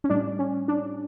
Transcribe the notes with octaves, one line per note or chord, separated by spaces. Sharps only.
C#4
A2 G3 D4
C#4
D4